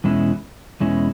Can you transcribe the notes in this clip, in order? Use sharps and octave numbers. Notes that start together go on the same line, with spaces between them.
E2 B2 G#3 C#4 E4
E2 B2 G#3 C#4 E4